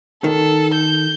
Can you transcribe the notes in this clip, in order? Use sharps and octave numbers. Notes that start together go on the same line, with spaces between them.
D#3 A4
G6